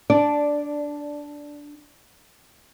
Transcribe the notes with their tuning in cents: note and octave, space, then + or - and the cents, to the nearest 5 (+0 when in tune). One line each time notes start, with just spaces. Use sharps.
D4 -5 D5 +0